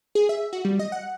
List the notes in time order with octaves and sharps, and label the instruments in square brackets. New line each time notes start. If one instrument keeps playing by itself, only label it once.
[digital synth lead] G#4
E5
F#4
G3
D#5
F#5